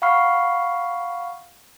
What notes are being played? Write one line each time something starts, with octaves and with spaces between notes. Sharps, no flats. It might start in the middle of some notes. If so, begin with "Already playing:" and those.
F5 F#5 B5 C#6 F6 C7